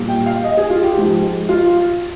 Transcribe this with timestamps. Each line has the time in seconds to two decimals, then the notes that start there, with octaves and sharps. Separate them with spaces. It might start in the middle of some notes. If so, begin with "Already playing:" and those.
Already playing: A#2 G3 A#3
0.08 G5
0.26 F5
0.44 D#5
0.57 G#4
0.70 F4
0.83 G4
0.97 G#2 F3 G#3
1.49 F4